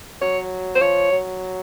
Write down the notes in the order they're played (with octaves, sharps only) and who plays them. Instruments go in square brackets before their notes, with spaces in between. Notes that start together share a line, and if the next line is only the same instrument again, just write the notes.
[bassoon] F#3 [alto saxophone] C#5
[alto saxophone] C5
[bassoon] F3 [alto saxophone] C#5
[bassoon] F#3